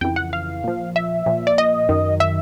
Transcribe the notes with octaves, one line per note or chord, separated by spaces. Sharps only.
F2 C#3 E3 G5
F#5
F5
A#2 F3
E5
A#2 F3
D5
D#5
F#2 D#3
E5